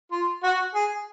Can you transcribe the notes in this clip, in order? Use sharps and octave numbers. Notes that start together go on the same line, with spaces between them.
F4
F#4
G#4